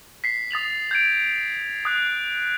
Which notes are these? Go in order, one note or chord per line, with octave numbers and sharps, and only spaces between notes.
B6 C7
D#6 A6 F7 F#7
G6 G#6 D7
D#6 F#6